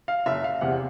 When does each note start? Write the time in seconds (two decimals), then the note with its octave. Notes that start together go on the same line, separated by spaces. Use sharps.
0.08 F5
0.26 F#1 E5
0.44 F5
0.61 E2 C3 F#5